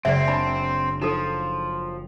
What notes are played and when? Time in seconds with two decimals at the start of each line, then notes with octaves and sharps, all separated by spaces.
0.05 F#1 G#3 C4 D5 E5 B6
0.28 D4 A5 B5
1.02 F3 D#4 F4 A4